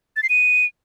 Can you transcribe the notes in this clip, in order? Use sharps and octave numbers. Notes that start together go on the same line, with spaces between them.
A6
C7
D#7